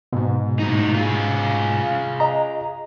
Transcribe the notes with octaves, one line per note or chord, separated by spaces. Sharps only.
G#2 B2
A2 D#4
F4 G#4
D#5 A#5